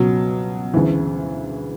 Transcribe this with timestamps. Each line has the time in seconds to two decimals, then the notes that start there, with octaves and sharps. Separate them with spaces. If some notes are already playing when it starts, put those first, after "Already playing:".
Already playing: C#2 B2 F#3
0.74 D2 C#3 E3